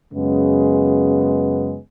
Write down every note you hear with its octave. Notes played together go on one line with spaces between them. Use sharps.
F#2 C#3 G#3 B3